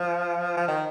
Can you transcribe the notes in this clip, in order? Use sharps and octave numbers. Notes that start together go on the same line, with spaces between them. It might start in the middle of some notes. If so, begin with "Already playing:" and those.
Already playing: F3
F3
D#3